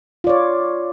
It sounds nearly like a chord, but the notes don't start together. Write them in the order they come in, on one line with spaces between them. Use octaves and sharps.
F4 D5 C#5